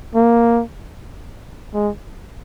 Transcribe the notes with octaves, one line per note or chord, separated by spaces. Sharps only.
A#3
G#3